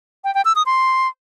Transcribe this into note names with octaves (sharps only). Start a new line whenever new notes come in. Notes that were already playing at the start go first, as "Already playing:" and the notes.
G5
G5
E6
D#6
C6